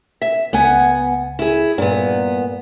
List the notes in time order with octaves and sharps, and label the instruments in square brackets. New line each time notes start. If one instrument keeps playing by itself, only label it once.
[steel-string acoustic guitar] E5
[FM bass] C#2 [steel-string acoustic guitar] B3 F#5 G#5
[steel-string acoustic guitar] E4 G#4
[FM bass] G2 [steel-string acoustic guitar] A#2 B3